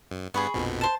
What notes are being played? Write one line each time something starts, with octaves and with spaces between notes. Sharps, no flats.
F#2
G2 B3 G#4 B5 C#6
A#1 F2 B2
C5 A5